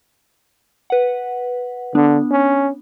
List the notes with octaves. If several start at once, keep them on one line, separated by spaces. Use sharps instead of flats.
B4 F#5
D3 B3 D4
C#4